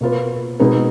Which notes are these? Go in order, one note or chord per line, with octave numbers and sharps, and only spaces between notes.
B2 A#3 F4 B4
B2 G#3 D#4 G#4 B4